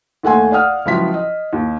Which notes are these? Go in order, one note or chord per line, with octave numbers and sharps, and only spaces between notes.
D#2 A3 F#5 G#5 C6
D5 F5 F#5 D#6 F6
C#2 F3 F#3 E4 F4 B6
D#5
D#2